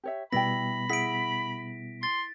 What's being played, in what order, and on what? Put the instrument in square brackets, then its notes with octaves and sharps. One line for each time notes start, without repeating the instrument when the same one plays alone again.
[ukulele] G4 C#5 E5
[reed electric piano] B2 G3 B3 [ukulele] E4 D5 G5 [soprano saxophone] B5 [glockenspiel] A#6
[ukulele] E4 G#4 F#5 [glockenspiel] B6 D7
[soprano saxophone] C6 [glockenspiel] A6